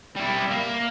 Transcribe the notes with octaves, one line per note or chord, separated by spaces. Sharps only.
G3 E4
A#3